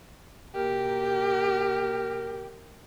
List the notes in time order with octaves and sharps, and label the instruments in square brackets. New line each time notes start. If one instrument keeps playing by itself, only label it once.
[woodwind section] B2 A#3 A#4 [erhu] G4